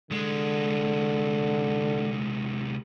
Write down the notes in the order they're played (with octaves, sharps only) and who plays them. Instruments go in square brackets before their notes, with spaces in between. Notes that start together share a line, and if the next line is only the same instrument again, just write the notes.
[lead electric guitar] C2 G#3 [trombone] D3